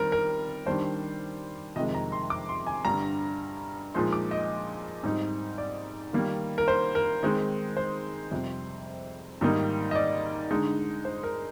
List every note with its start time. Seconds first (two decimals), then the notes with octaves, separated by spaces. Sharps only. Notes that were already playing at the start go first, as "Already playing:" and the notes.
Already playing: D#3 G3 C4 A#4
0.12 A#4
0.66 D#3 G3 D4 C5
1.76 F2 C3 D#3 G#3 D#5
1.95 A#5
2.12 C6
2.30 D6
2.49 C6
2.67 G#5
2.85 G2 D3 G3 A#5
3.94 A#2 F3 G#3 D#4 C6
4.13 D6
4.31 D#5
5.03 G#2 G3 C4 D#4
5.58 D5
6.13 D#3 G3 A#3
6.58 A#4
6.68 C5
6.95 A#4
7.23 D#3 G#3 C4 D#4
7.77 C5
8.31 F2 C3 G3
9.41 G#2 D#3 G3 A#3 D#4
9.91 D#5
9.95 D5
10.51 D3 G#3 D#4
11.05 C5
11.23 A#4